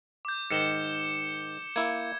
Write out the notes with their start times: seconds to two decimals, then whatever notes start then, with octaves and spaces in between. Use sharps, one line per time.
0.25 D6 G6
0.51 G#2 D#3 C#7 E7 G7
1.76 A#3 E4 G#6